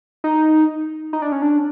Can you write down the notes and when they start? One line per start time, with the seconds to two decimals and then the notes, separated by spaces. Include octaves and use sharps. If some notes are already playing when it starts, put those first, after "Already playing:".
0.24 D#4
1.13 D#4
1.22 D4
1.32 C#4
1.42 D4